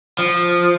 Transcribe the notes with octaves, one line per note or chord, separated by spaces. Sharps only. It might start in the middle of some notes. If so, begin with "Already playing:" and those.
F3